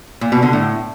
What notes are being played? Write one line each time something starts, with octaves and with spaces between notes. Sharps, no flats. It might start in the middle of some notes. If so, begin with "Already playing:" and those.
A#2
B2
D3
A2